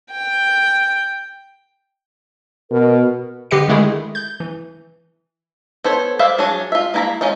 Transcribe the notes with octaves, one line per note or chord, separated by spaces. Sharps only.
G5
B2 A#4
D3 G4 B4 D#5 C7 C#7
D3 D#3 G#3 A3 E4 G#4
G6
E3
B3 A4 C5 C#5
B4 C5 D5 E5 F5
F#3 D4 G#4 C#5
F4 E5
A#3 E4 G#5 A#5 B5
G#3 C#4 D#4 F4